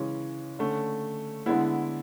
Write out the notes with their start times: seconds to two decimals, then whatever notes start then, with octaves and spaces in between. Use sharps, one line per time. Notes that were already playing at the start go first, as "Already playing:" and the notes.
Already playing: C#3 E3 G#3 C#4
0.59 D3 A3 C#4
1.46 D3 G#3 B3 E4